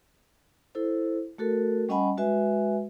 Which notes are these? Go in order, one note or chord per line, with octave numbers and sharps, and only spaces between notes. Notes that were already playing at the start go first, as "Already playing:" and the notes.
E4 A4 C5
A3 F#4 A4 A#4
G3 C#4 D#5 F#5 G#5 B5
G#3 F#4 B4 E5 G#5